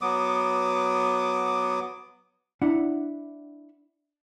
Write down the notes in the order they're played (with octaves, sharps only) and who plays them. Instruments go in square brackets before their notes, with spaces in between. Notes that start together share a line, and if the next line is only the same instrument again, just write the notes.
[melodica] F#3 B3 D6 D#6
[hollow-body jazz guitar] D4 E4 F#5